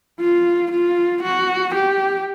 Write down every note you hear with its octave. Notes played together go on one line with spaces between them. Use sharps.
F4
F4
F#4
G4